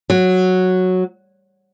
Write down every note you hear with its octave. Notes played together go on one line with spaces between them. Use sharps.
F#3